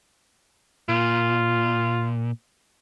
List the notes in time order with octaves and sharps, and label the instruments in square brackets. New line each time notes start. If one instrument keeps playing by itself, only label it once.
[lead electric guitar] A#2 [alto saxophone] F4